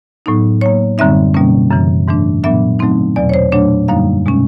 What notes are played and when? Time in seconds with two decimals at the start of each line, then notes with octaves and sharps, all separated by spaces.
0.26 A2 F#3 B3 D#4
0.61 A2 F#3 A#3 C#5
0.98 F#2 D3 G3 C4 D#4 E5
1.34 B2 G3 A#3 C#4
1.71 F#2 C#3 E3
2.08 G#2 E3 A3 D4
2.43 A#2 F#3 B3 D4 E5
2.79 D3 F#3 A3 C4 D#4
3.16 E2 B2 F#3 D5
3.29 C#5
3.34 C5
3.52 A#2 F#3 A3 D4 C#5
3.88 F#2 D3 G3 A#3 D#4 F5
4.26 B2 G#3 C#4